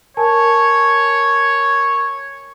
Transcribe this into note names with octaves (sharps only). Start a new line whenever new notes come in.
A#4 C#5 G#5 A5